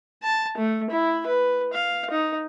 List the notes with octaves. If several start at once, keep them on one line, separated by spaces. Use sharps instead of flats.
A5
A3
E4
B4
F5
D#4